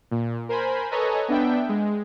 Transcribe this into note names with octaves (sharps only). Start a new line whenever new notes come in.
A#2
A#4 C5 G#5 B5
A4 B4 C#5 D#5 G#5 A#5
B3 D4 E5 G5
G#3